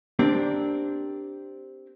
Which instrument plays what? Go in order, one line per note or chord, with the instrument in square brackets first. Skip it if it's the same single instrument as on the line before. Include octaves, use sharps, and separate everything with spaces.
[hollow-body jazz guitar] C4 D4 G4 A#4